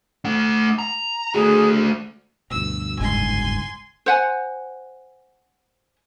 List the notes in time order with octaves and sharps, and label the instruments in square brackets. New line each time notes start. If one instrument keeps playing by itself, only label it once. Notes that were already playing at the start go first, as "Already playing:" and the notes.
[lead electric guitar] A3 F#5
A#5
[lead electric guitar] A3 F#4 [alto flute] G#4
[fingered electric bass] D2 G2 B2 [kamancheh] E6
[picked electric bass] F#1 G#2 [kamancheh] G#5 C6
[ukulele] C5 F#5 G#5